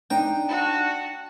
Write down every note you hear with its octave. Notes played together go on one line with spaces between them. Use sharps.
D4 D#4 G5
F#4 A5